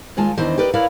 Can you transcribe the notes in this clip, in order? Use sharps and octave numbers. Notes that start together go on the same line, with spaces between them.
D#2 G#3 F4 G#5 A5
E2 D#3 D4 E4 C5 D#5
G4 A#4 B4 D5 D#5
E4 A#4 B4 C#5 D5 F5